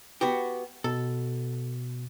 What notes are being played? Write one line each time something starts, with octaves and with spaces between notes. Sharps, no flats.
B3 F#4 G4
B2 A4